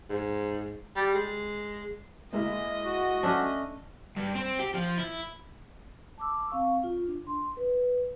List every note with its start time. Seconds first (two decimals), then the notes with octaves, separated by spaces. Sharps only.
0.10 G#2
0.96 G3
1.14 G#3
2.33 G#3 A#3 E4 D#5
2.84 F#4
3.23 A3 C#4 D4
4.17 G2
4.36 C4
4.60 G4
4.75 F3
4.99 E4
6.18 A5 D6 E6
6.50 C4 F5 C#6
6.84 F4
7.07 D4
7.27 C6
7.57 B4